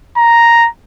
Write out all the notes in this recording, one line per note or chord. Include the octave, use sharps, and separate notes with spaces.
A#5